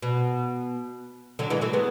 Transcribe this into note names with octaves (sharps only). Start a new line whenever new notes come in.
B2
D3 F#3
E3 G#3
F#3 A3
G#3 B3